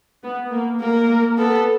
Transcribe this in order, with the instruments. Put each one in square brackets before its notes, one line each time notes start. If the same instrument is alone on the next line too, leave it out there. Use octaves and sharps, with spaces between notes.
[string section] B3
A#3
[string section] A#3 [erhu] A#4
[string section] A#3
[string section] B3 [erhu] A4